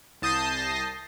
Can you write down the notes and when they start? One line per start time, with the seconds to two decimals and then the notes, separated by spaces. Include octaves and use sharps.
0.22 C2 A5 D#6 G6 A#6 C7